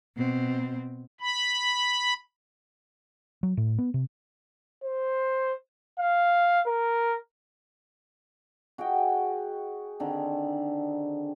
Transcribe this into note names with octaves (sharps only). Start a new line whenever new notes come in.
B2 C4
B5
F#3
A2
B3
C3
C5
F5
A#4
F#4 G#4 D#5 G5
D3 D#3 C4 G#5